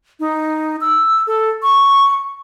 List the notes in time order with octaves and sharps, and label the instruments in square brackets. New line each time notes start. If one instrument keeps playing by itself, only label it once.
[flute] D#4
E6
A4
C#6